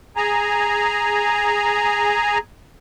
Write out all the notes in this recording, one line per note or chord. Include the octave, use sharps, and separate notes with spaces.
G#4 G#5 A#5